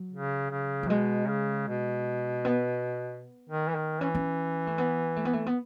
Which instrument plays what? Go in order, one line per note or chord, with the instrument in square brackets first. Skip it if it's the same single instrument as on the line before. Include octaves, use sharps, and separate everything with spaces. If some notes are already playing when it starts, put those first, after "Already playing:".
Already playing: [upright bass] F#3
[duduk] C#3
C#3
[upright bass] F#3
[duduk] B2 [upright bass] G#3
[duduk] C#3
B2
[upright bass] B3
[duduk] D#3
E3
D#3
[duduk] E3 [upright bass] C#4
[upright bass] C#4
A3
B3
A3
B3
A3
B3